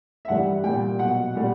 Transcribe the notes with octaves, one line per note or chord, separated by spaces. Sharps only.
E5
G2 E3 G3 F#5
A#2 G3 G5
B2 F#3 F#5
A#2 G3